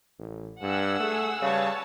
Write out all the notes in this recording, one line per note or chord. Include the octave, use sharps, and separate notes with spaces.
A1
G2 F#5 G#5 E6
A3 G#4
C#3 G3 B4 C#5 A5